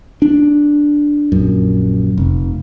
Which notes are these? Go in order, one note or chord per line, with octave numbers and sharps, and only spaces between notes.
D4
A#1 F#2
F1